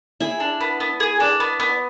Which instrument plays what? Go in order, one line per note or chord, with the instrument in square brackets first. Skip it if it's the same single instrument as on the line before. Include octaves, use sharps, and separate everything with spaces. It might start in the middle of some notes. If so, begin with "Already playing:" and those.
[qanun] E4 [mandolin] G#4
[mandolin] D4
B3
B3
G#4
D4
B3
B3